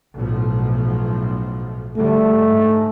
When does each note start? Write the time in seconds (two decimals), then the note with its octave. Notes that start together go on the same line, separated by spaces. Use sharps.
0.13 B1 A2 F3
1.96 A2 D3 G3 A3
2.28 G#2